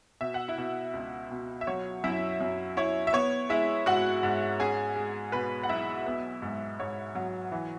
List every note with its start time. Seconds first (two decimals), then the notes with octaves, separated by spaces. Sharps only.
0.21 B2 E5
0.34 F#5
0.48 E4 E5
0.58 B2
0.94 C#2
1.31 B2
1.61 E5
1.67 F#3 C#5
2.04 F#2 E4 E5
2.41 F#2
2.77 E4 C#5
3.07 E5
3.13 B3 C#5
3.49 G#3 E4 E5
3.86 G#2 F#4 F#5
4.23 G#2
4.59 C#4 G#4 G#5
4.96 G#3
5.32 B2 B4 B5
5.63 F#5
5.69 B1 E4 E5
6.06 B3
6.42 G#2
6.79 G#2 C#5
7.15 F#3
7.52 E3